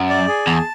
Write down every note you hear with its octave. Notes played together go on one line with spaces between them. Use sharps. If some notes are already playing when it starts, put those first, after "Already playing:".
Already playing: F#2
D5
G#4
E2 A5